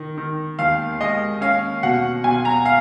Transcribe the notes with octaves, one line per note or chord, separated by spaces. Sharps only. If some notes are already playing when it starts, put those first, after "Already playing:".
Already playing: D#3
D#3
D#2 F5
G#3 D#5
C#4 F5
B2 F#5
B1 G#5
A#5
F5